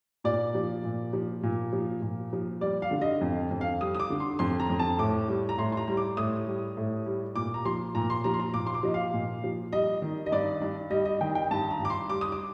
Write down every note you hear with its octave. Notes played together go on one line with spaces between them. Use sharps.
A#2 D5
F3
A#2
F3
A#2
F3
A#2
F3
G3 D5
F5
D3
D#5
F2
F2
F5
G3 D#6
D#6
D6
D3
C6
F2 C6
A#5
F2
A5
A2 D6
G3
A#5
A2 C6
C6
A#5
G3
D6
A2 D#6
G3
A2
G3
A#2 D6
A#5
F3 C6
A#2 A#5
C6
F3 A#5
C6
A#5
A#2 D6
C6
D6
F3 D#5
F5
A#2
F3
G3 D#5
D#3
D#5
G2 D5
G2
G3 D#5
D#5
D#3 G5
G5
G2 A5
A#5
G2 D6
C6
G3 D6
D#6
D6